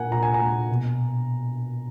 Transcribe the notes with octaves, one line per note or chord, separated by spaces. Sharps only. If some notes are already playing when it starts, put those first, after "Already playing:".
Already playing: A#2 A#3 F#5 G#5
A#2 A#5
G#5
A#5
A#3
B2